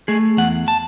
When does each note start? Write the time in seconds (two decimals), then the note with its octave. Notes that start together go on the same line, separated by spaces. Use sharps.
0.08 A3 G#4
0.37 E2 F#5
0.68 A5